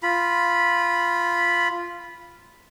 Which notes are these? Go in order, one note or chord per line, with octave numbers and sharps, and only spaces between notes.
F4 B5